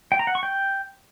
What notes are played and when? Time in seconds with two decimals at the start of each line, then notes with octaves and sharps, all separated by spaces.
0.12 G5
0.19 A#5
0.27 F#5
0.35 C#6
0.43 G5